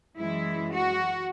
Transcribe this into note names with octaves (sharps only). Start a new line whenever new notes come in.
F#2 E3 G#3 E4
F#4